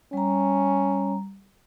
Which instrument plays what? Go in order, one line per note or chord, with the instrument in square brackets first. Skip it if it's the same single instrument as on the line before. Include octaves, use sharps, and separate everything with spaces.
[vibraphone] G3 A#5 [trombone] C#4